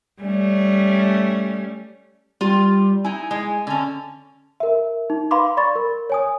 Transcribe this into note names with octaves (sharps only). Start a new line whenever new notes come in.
G3 A3 C#4
G3 F4
D#4 E4 G#5
G#3
D3 C#4
A#4 E5
D#4
B4 F5 B5 C6 D6
D5 B5 C#6 A6
A#4
C#5 G#5 D#6